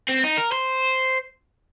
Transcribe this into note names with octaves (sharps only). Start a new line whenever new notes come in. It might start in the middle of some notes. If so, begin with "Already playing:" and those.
C4
D#4
A#4
C5